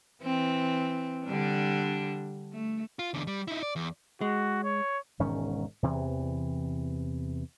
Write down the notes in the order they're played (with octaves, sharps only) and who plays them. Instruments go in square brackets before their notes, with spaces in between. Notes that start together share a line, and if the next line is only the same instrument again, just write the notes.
[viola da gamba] E3 C4
D3 G3 D4
A3
[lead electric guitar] F4
E2 D3
G3
D#4 E4
D5
E2
[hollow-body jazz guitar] G#3 [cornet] F#4
[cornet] C#5
[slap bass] E1 G#2 D#3 C#4
E2 C3 E3